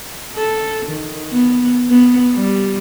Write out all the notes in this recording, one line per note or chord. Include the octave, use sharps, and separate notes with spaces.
A4
D#3
B3
B3
G3